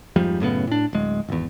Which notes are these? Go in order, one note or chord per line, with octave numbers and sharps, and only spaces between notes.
F2 G#2 F3 G3
F#2 A2 C#3 B3
A2 D4
D1 G#3
G#1 E2